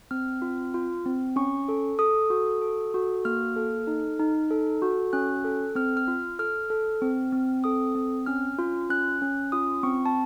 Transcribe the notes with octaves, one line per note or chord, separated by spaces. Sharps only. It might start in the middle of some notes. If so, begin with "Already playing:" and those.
C4 F6
F4
F4
C4
C#4 C#6
A4
A4 D#6
F#4
A4
F#4
A#3 F6
A4
D#4
D#4
A4
F#4
C#4 F#6
A4
C4 F6
F6
F4
A4 F6
A4
C4
C4
A4 D#6
C4
C#4 F6
F4
C#4 F#6
C#4
F4 D#6
C4 C#6
A5